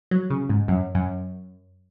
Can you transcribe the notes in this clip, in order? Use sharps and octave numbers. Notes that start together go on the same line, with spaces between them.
F#3
C#3
G#2
F#2
F#2